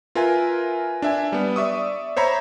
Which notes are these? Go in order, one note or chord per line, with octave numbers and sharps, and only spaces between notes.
F4 A#4 B4 E5 G#5
D4 E5 G#5
G3 B3
D5 E5 C#6 D#6
C5 C#5 E5 A#5 B5